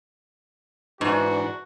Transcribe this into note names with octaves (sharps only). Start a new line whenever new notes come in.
G#2 E3 D4 F#4